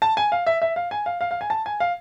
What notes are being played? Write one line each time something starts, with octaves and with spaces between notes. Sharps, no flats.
A5
G#5
F5
E5
E5
F5
G#5
F5
F5
F5
G#5
A5
G#5
F5